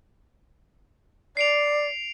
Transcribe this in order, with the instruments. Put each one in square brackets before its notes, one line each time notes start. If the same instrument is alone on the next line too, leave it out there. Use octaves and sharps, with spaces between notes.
[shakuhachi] D5 [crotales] C7 D7 F7